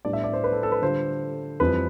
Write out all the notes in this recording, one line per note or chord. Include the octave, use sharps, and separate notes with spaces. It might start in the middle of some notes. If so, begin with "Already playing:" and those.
A2 G3 B3 D4 D5
E5
D5
C5
B4
A4
A4
B4
D3 G3 D4 F4 C5
F2 E3 G3 C4 F4 B4